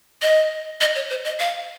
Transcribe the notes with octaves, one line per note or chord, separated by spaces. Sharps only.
D#5
D#5
C#5
C5
D#5
F5